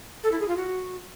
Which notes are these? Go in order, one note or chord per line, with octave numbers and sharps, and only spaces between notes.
A4
E4
G#4
F4
F#4